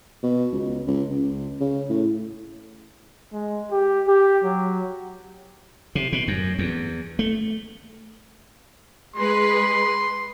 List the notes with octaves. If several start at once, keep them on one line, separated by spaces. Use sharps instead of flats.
B2
C#2
C#2
C#2
C#3
A2
G#3
G4
G4
F#3
C3
B2
F#2
E2
A3
G#3 B4 C6